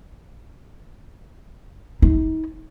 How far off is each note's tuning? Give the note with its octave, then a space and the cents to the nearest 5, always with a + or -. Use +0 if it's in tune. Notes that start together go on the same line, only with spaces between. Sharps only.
D#4 +40